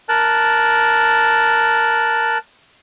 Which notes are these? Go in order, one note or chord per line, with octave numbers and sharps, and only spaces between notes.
A#4 A5 F#6